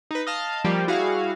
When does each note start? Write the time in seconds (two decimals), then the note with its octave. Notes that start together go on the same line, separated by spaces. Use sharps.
0.11 D#4 B4
0.27 D#5 F5 A5
0.64 F3 G3 A#3 G4
0.87 G3 E4 F#4 G#4 F5